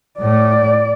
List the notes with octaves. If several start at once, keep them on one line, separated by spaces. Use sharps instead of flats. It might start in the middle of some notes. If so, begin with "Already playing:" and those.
A2 A3 D5